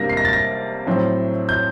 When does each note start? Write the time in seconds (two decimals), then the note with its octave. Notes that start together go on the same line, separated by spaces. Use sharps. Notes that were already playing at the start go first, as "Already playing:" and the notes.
Already playing: C3 G3 A#3 D4 A#6
0.09 C7
0.17 A#6
0.25 A6
0.33 A#6
0.87 A2 F#3 C4
1.49 G6